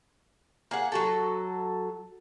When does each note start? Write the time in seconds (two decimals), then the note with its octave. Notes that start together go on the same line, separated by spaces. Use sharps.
0.71 A#3 G#4 F#5
0.92 F#3 F#4 A4